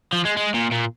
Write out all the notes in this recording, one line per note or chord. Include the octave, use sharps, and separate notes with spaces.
F3
G#3
G#3
A#2
A#2